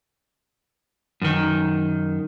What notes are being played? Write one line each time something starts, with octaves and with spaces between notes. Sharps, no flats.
F#2 D#3